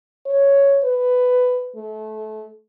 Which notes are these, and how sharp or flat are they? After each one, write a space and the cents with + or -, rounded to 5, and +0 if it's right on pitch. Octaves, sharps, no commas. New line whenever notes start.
C#5 +5
B4 +10
A3 -25